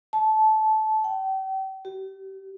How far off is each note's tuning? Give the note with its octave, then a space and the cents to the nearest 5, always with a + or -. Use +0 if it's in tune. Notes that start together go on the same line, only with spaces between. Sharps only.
A5 -15
G5 -40
G4 -45